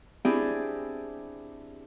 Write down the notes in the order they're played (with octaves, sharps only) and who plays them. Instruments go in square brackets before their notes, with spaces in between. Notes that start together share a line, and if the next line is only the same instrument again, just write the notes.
[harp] C4 D4 E4 G4 G#4